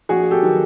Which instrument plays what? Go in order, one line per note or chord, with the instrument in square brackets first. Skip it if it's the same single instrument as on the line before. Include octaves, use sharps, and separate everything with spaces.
[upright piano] A#1 F#4 G#4
G4 A4
D#3 F#3